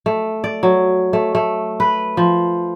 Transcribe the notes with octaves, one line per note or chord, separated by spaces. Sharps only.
A3
D5
F#3
A3
A3
B4
F3